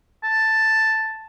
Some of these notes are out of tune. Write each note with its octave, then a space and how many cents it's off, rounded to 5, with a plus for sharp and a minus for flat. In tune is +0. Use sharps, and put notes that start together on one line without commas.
A5 +5